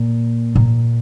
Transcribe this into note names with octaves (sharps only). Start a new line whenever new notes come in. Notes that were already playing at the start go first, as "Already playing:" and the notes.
Already playing: A#2
A#2